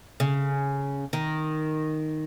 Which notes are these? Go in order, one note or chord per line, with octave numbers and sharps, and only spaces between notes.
C#3
D#3